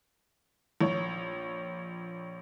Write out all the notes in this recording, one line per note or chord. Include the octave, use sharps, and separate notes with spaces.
A#1 C#5